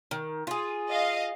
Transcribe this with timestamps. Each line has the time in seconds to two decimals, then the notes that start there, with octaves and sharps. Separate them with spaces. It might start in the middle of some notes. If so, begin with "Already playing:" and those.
0.11 D#3
0.47 F4 G#4
0.90 D#5 F5